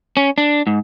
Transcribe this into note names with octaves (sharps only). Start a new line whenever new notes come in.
C#4
D4
G#2